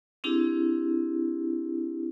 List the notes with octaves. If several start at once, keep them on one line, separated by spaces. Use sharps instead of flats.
C4 D4 E4 G4 G#4